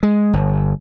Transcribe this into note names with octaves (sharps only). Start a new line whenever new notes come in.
G#3
G1